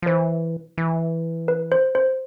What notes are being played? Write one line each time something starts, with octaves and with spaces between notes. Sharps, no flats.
F3
E3 C5
E3
B4
C5
C5